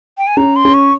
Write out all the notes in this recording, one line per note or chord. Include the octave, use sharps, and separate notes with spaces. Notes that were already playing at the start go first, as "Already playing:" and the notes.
G5
G#5
C#4 A#5
C6
C#4
C#6